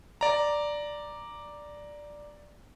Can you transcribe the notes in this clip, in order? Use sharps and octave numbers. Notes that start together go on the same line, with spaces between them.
D5 A#5